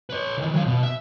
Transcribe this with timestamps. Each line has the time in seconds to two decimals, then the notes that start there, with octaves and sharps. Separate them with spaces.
0.10 B4 C#5
0.37 D#3 E3
0.53 F#3 F5
0.66 B2
0.83 E5